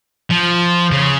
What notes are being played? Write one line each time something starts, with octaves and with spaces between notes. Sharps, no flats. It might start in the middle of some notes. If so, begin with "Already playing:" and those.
F3
C#3